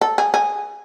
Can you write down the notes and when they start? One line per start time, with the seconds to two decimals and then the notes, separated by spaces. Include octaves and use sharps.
0.01 A4
0.18 G#4
0.34 G#4